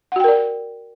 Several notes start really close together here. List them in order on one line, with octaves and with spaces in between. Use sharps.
F#5 F#4 G5 A#4 D5